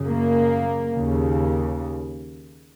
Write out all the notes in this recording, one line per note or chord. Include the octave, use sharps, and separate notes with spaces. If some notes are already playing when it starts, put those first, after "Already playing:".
Already playing: F#2 C#3
A#3
D#2 C#3